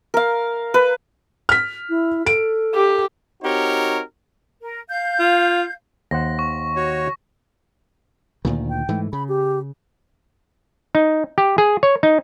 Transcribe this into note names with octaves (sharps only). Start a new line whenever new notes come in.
A#4 F5
B4
F6 B6
E4
A4 D7
G4
C4 D#4 F#4 G4 A#4 C#5
A#4
F5 G6
F4
D#2 C5 F#5 A#6
C#6
F#4 C#5
D2 A#2 D#3
G5
G#2 E3 A3
C#3 B5
G4
D#4
G4
G#4
C#5
D#4